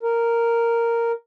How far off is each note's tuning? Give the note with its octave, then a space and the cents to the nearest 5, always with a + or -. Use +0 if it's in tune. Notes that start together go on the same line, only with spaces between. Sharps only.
A#4 -5